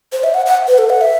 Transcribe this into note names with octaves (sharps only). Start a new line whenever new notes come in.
C5
E5
F#5
F#5
B4
A4
F#5
E5